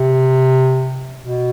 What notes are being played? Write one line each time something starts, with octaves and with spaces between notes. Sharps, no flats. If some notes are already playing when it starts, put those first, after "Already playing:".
Already playing: C3
B2